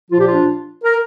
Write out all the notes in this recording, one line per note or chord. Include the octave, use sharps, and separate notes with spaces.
A#2 F3 F4
G4
D4 F4
A#4